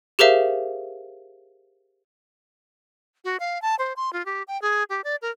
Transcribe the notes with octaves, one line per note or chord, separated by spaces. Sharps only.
G4 G#4 A#4 C5 E5 F5
F#4
F5
A5
C5
C6
F4
G4
G5
G#4
G4
D5
A#4